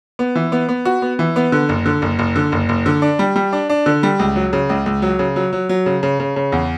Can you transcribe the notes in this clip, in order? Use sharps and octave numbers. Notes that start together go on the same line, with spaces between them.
B3
E3
B3
B3
F#4
B3
E3
B3
D3
F#1
D3
F#1
F#1
D3
F#1
F#1
D3
D4
G3
G3
D4
D4
D3
G3
C#2
F#3
C#3
C#2
C#2
F#3
C#3
F#3
F#3
F#3
C#3
C#3
C#3
C#3
E2